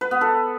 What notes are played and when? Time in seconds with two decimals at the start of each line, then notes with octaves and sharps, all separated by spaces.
0.01 B4
0.11 B3
0.21 A4